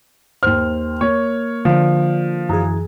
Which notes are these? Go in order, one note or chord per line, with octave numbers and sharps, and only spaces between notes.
D#2 C5 F6
A#3 C#5
D3 F3
F#2 E3 G#4 A#5 D#6